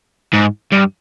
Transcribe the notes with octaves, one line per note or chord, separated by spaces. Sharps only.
G#2
G2